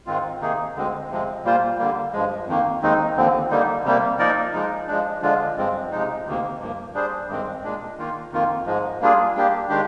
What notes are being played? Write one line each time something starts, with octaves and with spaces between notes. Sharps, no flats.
G#2 D#3 G#3 C4 F4
C3 D#3 A#3 D#4 G#4
D2 D3 G#3 C4
F2 C3 F3 G#3 C4
A#2 G3 A#3 F4 C5
D3 G3 A#3
G2 F3 G#3
F2 D#3 A#3
D#2 D#3 G#3 C4 D#4
D#2 D3 F3 C4
D3 G3 A#3 D#4
C3 G3 A#3
F3 A#3 D#4 A#4 D5
F3 G#3 D#4
F3 G#3 D4
D3 F3 G#3 D4 F4
G2 F3 G#3 C4
C3 F3 G#3 D#4
D2 C3 D#3 A#3
G2 F3 A#3
G3 D4 G#4 C5
G2 D#3 G#3 C4
A#2 G#3 D4
D#3 A#3 F4
F2 D#3 A#3 F4
G#2 F3 G#3
G3 A#3 D4 F4 G#4
G3 A#3 D4 G4
D#3 G#3 D4 G4